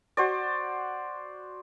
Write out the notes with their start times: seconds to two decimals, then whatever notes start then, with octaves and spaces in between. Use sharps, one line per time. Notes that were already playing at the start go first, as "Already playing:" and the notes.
0.17 F#4 C5 D5